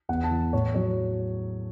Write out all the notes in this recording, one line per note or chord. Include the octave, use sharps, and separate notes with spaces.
E2 F#5
A5
E3
A2 C#5
F#3 C#5